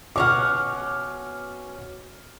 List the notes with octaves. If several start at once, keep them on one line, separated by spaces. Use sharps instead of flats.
B2 C#4 F#5 D6 F6